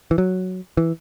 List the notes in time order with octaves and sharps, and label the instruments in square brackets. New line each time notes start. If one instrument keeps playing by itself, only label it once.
[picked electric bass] E3
F#3
E3